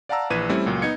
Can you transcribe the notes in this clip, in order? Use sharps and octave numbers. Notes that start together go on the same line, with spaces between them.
D5 F5 F#5 A5 A#5 E6
A#1 E3 B4 G#6 D#7
G3 A3 C4 C#4 E4
C#2 A#2 F#3
B3 D#4 G#6 C#7